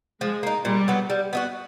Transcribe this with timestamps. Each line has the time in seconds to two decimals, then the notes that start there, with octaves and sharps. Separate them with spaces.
0.21 F3 G#3
0.43 A#3 D#4
0.65 A#2 G3
0.88 F#3 B3
1.10 G3
1.33 B3 D#4 F#4